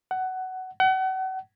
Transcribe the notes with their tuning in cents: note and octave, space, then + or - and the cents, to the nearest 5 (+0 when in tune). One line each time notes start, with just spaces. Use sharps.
F#5 +15
F#5 +35